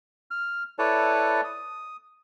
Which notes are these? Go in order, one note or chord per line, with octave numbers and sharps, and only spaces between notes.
F6
E4 A4 B4 C#5 D5 A5
D#6